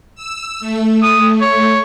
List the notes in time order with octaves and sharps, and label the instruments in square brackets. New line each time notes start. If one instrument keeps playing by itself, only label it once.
[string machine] E6
A3
[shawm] D#6
C#5